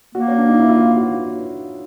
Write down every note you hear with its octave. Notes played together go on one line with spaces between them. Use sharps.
A#3 F#4
C#4
D4
D#4
E4
F4
F#4